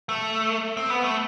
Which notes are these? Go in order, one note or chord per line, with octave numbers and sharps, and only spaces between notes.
A3
C4
B3
A3